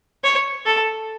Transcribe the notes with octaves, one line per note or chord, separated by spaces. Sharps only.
C#5
A4